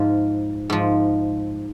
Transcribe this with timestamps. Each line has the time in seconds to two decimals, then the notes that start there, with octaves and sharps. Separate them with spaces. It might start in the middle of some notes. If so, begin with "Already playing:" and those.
Already playing: G#2 F3
0.70 G#2 F3